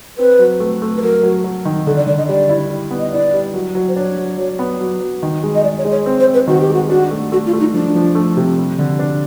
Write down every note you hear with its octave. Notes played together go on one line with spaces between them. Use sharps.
C4 B4
F#3
A3
A3
B4
F#3 A#4
F#3
F#3
D#3
D3 A4
D5
D3 D5
D#5
G3 D5
E4
G3
B3
D#5
E4 D5
G3
F#3
F#3
C5
D4 C#5
F#3
F#3
B3
F#3
F#3
D#3
G#3
D#5
G#3 D5
C#5
G#3
C#5
C4
C5
C4
B4
D#3 F#4
G4
G#3 F#4
D4 F#4
A3
A3 F#4
F4
A3
D#4
F3 D4
F3
A3
C3
G3
D3
D4